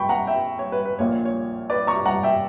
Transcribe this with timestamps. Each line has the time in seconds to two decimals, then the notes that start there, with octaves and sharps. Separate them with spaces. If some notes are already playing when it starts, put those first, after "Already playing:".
Already playing: G5 B5 C#6
0.09 F#5 A#5
0.27 E5 G5
0.59 C#5
0.72 B4
0.85 B4
0.99 A#1 A#2 A#3 C#5
1.25 C#5
1.70 B4 D5
1.87 A#5 C#6
2.06 F#5 A#5
2.23 E5 G5